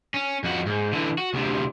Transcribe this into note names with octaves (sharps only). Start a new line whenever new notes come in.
C#4
F2 F#4
G#2
D3 E3
F#4
D2 C3